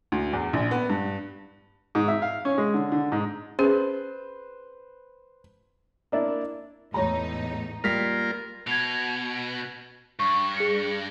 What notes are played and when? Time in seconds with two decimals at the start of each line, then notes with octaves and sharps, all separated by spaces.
0.12 D2
0.33 E2
0.53 A#1
0.71 B3
0.90 G2
1.95 G#2
2.08 E5
2.22 F5
2.45 C#4
2.58 G#3
2.74 D3
2.92 D3
3.12 G#2
3.59 C#4 G#4 B4 C5
6.12 A#3 D4 E4
6.94 E2 A2 D#4 C#5 A#5
7.84 G3 A#3 F4 A#4 B6
8.67 B2 G#6 F7
10.19 G2 C#6
10.57 G#4 C#7